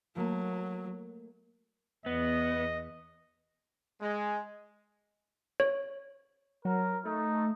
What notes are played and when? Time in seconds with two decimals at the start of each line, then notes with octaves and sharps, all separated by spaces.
0.16 F#3 A3 A#3
2.06 E2 B3 D#5
4.01 G#3
5.60 C#5
6.65 F#3 A#4
7.05 A3 D#4